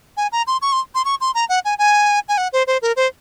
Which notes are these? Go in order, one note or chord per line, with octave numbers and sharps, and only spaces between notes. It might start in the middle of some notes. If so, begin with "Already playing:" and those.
G#5
A#5
C6
C#6
C6
C6
C#6
C6
A#5
F#5
G#5
G#5
G#5
F#5
C5
C5
A#4
C5